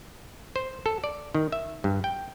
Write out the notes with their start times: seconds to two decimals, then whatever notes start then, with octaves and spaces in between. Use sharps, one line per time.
0.56 C5
0.86 A4
1.04 D5
1.35 D#3
1.52 E5
1.84 G2
2.04 G5